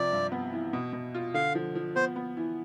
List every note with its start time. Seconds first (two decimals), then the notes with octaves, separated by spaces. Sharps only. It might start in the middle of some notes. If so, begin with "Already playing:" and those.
Already playing: C3 F3 D5
0.12 G2
0.32 B3
0.53 E3
0.73 B2
0.93 B2
1.14 F4
1.34 D3 F5
1.55 F3
1.75 F3
1.96 B3 C5
2.16 B3
2.37 E3